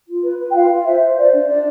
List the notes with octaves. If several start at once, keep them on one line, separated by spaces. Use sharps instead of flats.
F4
B4
B4
G5
F4 F5
F4
C5 E5
C5
C5 D5
D4
D4 D5